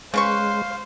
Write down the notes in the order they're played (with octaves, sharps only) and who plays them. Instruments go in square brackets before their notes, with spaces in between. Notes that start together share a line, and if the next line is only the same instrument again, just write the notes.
[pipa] C#3 B4 C#6 [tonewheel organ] G#3 [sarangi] C5 [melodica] F5